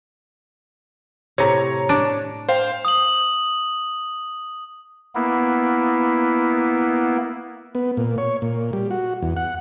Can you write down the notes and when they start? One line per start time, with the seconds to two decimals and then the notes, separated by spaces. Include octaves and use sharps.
1.38 A2 C3 C#5 A#5
1.89 D4
2.49 C5 F5 G5
2.85 D#6 F#7
5.15 A#3 B3 E4
7.75 B3
7.97 A#2
8.18 C#5
8.42 A#2
8.73 G3
8.91 F#4
9.23 E2
9.37 F#5